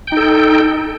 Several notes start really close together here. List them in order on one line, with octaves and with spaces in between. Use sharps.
G5 D#4 A4